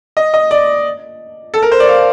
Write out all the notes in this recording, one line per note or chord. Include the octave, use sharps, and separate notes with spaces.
D#5
D#5
D5
A4
A#4
C5
D5
F5